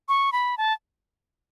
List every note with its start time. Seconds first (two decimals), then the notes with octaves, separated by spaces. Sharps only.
0.09 C#6
0.32 B5
0.58 A5